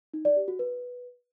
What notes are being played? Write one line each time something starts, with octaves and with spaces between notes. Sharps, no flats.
D#4
D5
G4
F#4
B4